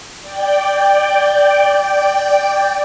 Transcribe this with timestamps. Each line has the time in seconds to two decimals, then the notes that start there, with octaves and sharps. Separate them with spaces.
0.21 D5 G5